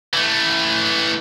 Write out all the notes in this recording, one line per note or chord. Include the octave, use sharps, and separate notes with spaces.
E3 A3